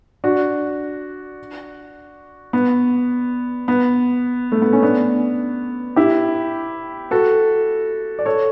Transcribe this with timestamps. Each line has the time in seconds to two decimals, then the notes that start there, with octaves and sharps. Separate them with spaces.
0.24 D4 F#4
2.53 B3
3.68 B3
4.52 A3
4.62 B3
4.73 C#4
4.82 B3 D4
5.96 E4 G4
7.11 F#4 A4
8.19 D5
8.26 A4 C#5